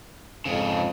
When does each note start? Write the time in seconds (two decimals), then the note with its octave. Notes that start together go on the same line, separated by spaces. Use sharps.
0.45 F2 G#2 C#3